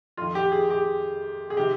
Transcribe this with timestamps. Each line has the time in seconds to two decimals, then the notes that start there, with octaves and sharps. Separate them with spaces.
0.17 F2 D#3 F4
0.35 G4
0.52 G#4
0.70 G4
1.50 G#4
1.57 C3 D#3 G4